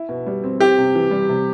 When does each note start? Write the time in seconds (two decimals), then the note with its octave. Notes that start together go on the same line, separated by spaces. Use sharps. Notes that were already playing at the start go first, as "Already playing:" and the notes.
Already playing: E4
0.09 B2
0.27 G3
0.44 C4
0.60 C4 G4
0.78 C3
0.95 E3
1.11 G3
1.29 C3